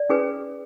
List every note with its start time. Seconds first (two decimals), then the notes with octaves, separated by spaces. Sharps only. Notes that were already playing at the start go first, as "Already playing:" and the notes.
Already playing: D5
0.10 C#4 G#4 B4